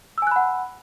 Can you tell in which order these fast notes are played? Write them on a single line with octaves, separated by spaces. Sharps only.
E6 G#5 F#6 B5 F#5